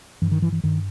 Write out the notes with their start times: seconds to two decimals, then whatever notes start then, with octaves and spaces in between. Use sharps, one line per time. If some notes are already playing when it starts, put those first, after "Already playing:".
0.22 G2 E3
0.32 D#3
0.42 E3
0.52 E3
0.64 G2 D#3